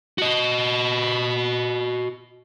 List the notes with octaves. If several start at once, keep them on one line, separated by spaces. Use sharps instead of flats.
F#4 D#5